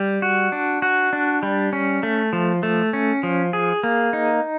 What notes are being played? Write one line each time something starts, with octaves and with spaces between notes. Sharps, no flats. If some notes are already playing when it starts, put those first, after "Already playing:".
Already playing: G3
F#4
D4
F#4
D4
G3
C#4
A3
F3
A3
C#4
F3
G#4
A#3
D#4